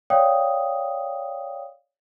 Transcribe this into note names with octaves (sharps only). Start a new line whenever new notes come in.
C#5 D5 F5 G5 D#6